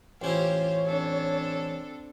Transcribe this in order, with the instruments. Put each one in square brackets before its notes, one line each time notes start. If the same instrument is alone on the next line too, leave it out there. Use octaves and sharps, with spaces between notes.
[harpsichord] A1 C#4 E4 [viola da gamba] F4 G4 C5 [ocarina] C#5
[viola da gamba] C4 D4 A4